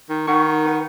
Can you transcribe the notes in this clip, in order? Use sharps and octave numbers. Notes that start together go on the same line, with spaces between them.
D#3
D#3 B4 F#5 C#6
B4 F#5 C#6